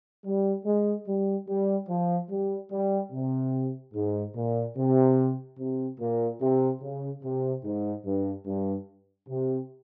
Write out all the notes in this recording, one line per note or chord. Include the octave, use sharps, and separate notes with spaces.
G3
G#3
G3
G3
F3
G3
G3
C3
G#2
A#2
C3
C3
A#2
C3
C#3
C3
G#2
G2
G2
C3